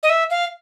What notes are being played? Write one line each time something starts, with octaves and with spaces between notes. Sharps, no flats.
D#5
E5
F5